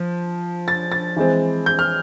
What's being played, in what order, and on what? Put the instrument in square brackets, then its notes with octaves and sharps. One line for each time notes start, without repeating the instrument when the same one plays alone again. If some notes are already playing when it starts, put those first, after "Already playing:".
Already playing: [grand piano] F3
A6
A6
E3 G#3 C4
G6
F6